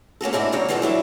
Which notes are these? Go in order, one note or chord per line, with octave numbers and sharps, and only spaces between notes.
A#3 C#4 F#4 A4
G#2 C4 D4 E4 F#4
F#2 C#3 A#3 C4 C#5 D5
B2 E3 F3 G3 G#4 A4
F#3 D4 E4 A4